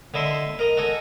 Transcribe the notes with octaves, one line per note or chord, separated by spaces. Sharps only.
D3 E4 D#5 E5 C6
A#4 D#5 A#5
F#4 A4 D#5 G#5